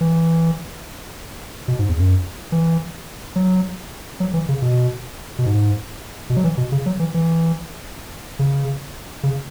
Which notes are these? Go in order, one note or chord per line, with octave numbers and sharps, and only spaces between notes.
E3
B2
G#2
E2
F#2
E3
F#3
F#3
E3
C#3
B2
B2
G#2
B2
F#3
E3
B2
C#3
F#3
E3
E3
C#3
C#3